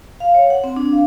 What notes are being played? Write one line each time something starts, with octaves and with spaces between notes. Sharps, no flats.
F5
C#5
F#5
C4
D4
F5